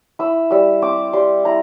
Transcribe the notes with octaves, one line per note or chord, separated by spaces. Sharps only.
E4 E6
G3 E6
C4 D6
G3 C6
E4 A#5